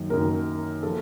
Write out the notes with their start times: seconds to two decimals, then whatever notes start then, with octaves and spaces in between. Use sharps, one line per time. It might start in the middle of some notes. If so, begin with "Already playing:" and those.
Already playing: F#2 D#3 F#3 A#3
0.10 F#2 D#3 F#3 A#3 A#4
0.83 F3 A#3 A4